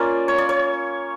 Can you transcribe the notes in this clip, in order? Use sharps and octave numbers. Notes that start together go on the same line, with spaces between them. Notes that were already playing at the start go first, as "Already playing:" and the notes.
Already playing: A#3 C#4 F4 D5
C#5
D5
C#5